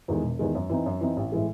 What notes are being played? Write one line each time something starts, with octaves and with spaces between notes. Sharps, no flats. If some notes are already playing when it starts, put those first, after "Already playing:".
E2 D#3 G#3
E1
E2 D#3 G#3
F#2
E3 C4 D#4
F#2
E3 C4 D#4
A1
A2 E3 G#3